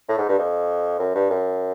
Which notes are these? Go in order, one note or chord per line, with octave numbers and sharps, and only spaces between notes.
A2
G#2
G2
F2
F#2
G2
F#2